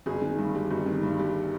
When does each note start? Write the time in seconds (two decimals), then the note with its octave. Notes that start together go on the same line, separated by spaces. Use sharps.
0.06 G1 G#4
0.22 D#3
0.38 G2
0.55 G3
0.71 G1
0.86 D#3
1.03 G2
1.19 G3